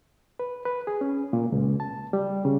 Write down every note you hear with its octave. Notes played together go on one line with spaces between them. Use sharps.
B4
B4
G#4
C#4
A#2
C#2
A5
G3
C#3